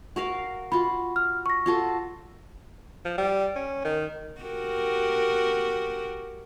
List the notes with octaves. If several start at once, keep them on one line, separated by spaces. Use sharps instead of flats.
F#4 A#4 F5
F4 F#4 B5
F6
C#6 A#6
F4 F#4 A4
F3
G3
C#4
D#3
F#4 G4 A#4